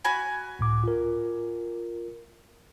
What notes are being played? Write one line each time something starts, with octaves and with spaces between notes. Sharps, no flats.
F#4 G#5 B5
C#2 A2 D6
F4 A#4